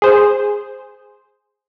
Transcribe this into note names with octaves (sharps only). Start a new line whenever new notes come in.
G#4 C5